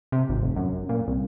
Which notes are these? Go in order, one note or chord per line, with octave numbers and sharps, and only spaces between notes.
C3
G#1
F1
F#2
A#2
C2